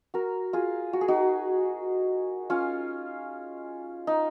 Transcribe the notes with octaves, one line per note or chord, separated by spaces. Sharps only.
F#4 A#4
F4 G#4
F#4
G#4
D#4 F#4
C#4 F4
D#4